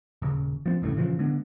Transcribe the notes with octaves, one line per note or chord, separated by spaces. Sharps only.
D#1 C#3
F3 B3 C4
E1 C2 A2 C#3
A#2 C#3 E3 F3
D3 G#3 B3 D4